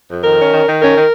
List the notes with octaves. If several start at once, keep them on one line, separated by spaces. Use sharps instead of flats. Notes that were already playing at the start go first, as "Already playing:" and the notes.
F2
D#3 A#4
C#4
D#3
D#3
C#4 A#4
D#3